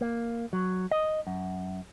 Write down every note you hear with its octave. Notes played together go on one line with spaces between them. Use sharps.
A#3
F#3
D#5
F#2